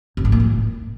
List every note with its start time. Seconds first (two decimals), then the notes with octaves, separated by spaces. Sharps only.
0.17 F#2
0.25 G#2
0.32 A#3
0.40 A2